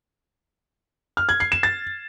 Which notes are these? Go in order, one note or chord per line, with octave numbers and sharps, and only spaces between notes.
F6
G#6
C7
E7
A6